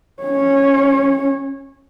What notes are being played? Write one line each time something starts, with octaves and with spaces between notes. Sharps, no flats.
C#4 C#5